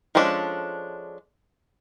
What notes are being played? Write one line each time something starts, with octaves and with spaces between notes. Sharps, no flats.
F3 G#3 C#4 D4 A4